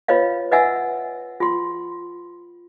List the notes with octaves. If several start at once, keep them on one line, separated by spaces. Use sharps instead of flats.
F4 B4 C#5 D#5 F5
B4 D#5 E5 F#5 G#5 E6
F4 C6